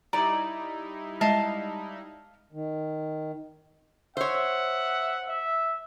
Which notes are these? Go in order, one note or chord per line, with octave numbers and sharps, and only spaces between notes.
G3 D#4 E4 D5 A#5
G#3 D#5 F5 A5
D#3
C5 C#5 E5 F#5
E5